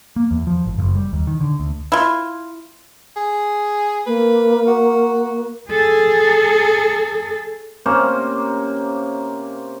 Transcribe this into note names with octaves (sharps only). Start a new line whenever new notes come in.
A#3
E2
F3
G#1
F#1
G3
D#2
D#3
D3
D2
E4 F4
G#4
A#3 B4
F#4
G#4 A4
C3 A#3 C#4 C5